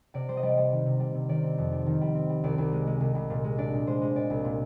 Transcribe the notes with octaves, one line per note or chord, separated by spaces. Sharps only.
C3 D5
G3 C5
D#5
G3 D5
G3 C5
D#3
C3
G3
C3
D#3 D5
C4
F2
G3
D#3
G3
C4
G3
C2 D5
C2
G#3
G#3
C2
C2
A#2
G#3
D4 D5
A#2
G#3 C5
G#3
A#2 D5
C2
A#2